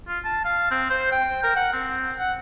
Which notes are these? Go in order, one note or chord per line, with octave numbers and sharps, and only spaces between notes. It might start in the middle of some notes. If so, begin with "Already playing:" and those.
F4
A5
F5
C4
C5
G5
A#4
F#5
C4
F#5